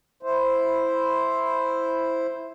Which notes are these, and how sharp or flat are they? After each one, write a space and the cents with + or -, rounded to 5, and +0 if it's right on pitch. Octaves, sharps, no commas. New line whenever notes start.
E4 +0 C5 +0